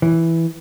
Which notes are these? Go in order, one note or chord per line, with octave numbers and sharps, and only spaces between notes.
E3